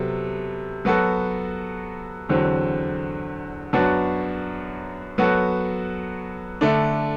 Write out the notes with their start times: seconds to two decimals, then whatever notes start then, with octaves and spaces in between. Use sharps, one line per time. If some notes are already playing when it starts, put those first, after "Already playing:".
Already playing: C3 F#3 B3 A4
0.85 F#3 B3 F#4 A4
2.29 E2 D3 F#3 C4
3.73 F#2 F#3 B3 D4 F#4
5.18 F#3 B3 F#4 A4
6.61 D3 A3 D4